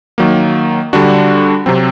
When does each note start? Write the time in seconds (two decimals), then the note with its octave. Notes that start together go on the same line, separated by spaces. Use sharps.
0.18 D#3 F#3 A#3
0.93 D3 G3 D4 F#4
1.66 C3 F#3 C4